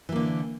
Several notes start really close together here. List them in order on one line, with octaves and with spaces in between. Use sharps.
E3 A#3 D3